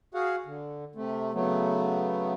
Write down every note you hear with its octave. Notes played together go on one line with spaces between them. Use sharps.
F#4 G#4 F5 F#5
D3
C3 A3
C#3 F#3 A3 B3